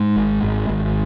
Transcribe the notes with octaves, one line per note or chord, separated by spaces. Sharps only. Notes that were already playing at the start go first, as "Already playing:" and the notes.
Already playing: G#2 G#3
G#1
G#1
G#1